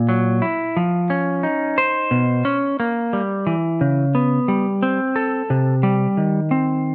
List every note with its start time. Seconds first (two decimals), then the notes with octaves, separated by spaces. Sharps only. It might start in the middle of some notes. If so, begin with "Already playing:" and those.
Already playing: A#2
0.09 F#3
0.42 E4
0.77 F3
1.10 C#4
1.43 D#4
1.78 C5
2.11 B2
2.45 C#4
2.80 A#3
3.13 G3
3.47 E3
3.81 C#3
4.15 B3
4.48 G3
4.83 C4
5.16 A4
5.50 C3
5.83 G3
6.17 D#3
6.51 C4